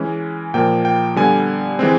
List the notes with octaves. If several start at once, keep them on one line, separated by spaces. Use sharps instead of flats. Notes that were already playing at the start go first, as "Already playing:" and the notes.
Already playing: E3 G#3 C#4
A#2 F3 A#3 G5
G5
D3 G3 B3 G#5
E3 G#3 C4